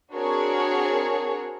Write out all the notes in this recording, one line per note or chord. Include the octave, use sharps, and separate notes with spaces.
C4 D4 F#4 G#4 A#4 C#5